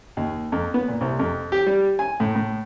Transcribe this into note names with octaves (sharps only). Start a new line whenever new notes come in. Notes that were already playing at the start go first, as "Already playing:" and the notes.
D#2
F2
B3
A#2
C2
F2
G4
G3
G#5
A2
A2